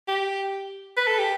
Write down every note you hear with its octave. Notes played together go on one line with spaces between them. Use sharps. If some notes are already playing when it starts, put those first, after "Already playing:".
G4
B4
A4
G4